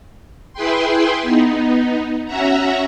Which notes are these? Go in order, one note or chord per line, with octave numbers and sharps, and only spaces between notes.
E4 G#4 B4 G5 C6
B3 D#4
C#4 F#4 E5 F#5 A#5